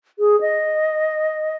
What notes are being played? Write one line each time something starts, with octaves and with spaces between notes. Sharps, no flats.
G#4
D#5